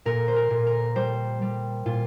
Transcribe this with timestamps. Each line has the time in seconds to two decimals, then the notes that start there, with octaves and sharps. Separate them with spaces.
0.05 A#2 A#4
0.28 C5
0.36 A#4
0.50 A#2
0.67 A#4
0.96 G3 C5
1.42 G3
1.86 A#2 F4